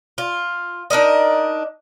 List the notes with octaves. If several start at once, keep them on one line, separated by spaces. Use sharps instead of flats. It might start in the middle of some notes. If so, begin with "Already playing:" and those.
F4
D4 D#4 A#4 D#5